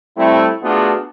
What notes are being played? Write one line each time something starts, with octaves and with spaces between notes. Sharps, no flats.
G3 A3 C4 E4
A3 B3 D4 F4 F#4 G#4